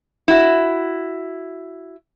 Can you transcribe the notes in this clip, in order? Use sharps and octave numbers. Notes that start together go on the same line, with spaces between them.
E4 F#4